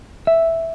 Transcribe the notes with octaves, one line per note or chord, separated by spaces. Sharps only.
E5